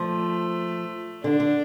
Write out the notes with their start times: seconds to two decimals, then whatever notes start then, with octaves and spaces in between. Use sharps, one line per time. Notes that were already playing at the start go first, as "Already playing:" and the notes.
Already playing: F3 A3
1.24 D3 D4
1.40 D3